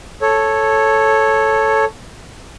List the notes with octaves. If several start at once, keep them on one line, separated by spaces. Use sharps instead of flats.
A4 C#5